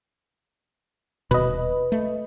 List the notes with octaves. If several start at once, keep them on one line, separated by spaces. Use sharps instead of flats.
D#1 B2 B4 D#5
A3